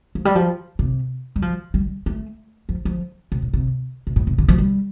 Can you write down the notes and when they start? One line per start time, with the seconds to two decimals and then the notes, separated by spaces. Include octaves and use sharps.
0.15 F3
0.25 G3
0.35 F3
0.79 C3
1.36 G3
1.42 F3
1.74 G3
2.06 A3
2.69 F3
2.85 F3
3.32 C3
3.42 A2
3.53 C3
4.07 C3
4.16 A2
4.27 C3
4.38 D3
4.48 F3
4.58 G3